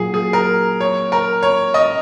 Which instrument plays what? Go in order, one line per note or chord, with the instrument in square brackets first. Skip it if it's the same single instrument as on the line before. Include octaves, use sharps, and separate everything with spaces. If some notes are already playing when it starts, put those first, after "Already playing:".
Already playing: [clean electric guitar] A#2 F#3 [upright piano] G#4 G#5
[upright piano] G#4
A#4
C#5
A#4
C#5
D#5